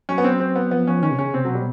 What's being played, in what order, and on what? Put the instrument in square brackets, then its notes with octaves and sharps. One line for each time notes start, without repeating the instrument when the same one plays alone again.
[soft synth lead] F#3 [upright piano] C#4
[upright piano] B3
C4
C4
B3
[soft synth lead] F3 [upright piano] B3
[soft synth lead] F3 [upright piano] C#4
[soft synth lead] D#3 [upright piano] C#4
[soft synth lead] C3
[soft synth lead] C#3 [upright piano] C#4
[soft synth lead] C3 [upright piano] C4
[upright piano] F#3
[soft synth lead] B2
[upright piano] G3